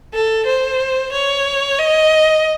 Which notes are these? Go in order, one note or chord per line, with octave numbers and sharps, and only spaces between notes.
A4
C5
C#5
D#5